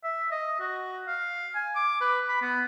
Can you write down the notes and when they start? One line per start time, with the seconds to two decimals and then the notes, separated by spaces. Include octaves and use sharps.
0.04 E5
0.31 D#5
0.60 F#4
1.08 F5
1.55 G#5
1.75 D6
2.01 B4
2.28 B5
2.42 B3